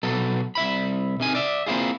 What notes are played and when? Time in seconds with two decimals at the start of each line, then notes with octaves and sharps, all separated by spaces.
0.03 B2 F#3 A4
0.55 C2 E5 B5
1.20 C3 D#3 G#5
1.35 D5 E5
1.66 A#3 C4 E4 F4 G#4